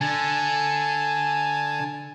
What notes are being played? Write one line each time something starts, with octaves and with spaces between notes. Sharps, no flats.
D3 G#5 A5